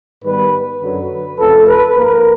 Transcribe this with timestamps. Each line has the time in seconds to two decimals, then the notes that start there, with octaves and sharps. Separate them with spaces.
0.24 G#2 D#3 G3 B3 B4
0.52 B4
0.82 F#2 D3 F#3
1.39 F2 C#3 F3 A3 A4
1.67 B4
1.96 G#2 F3 A#3 A#4